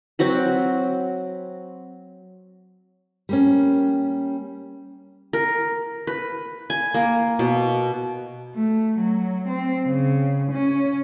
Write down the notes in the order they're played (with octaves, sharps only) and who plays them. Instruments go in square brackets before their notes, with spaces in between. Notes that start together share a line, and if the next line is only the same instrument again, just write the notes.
[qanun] F#3 C4 F#4 B5
[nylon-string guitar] G3 A#3 C#4
[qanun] A#4
B4
G#5
A#3
B2
[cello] A3
F#3
C4
C#3
C#4